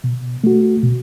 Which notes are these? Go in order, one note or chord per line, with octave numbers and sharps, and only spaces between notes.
B2
A3 F#4
B2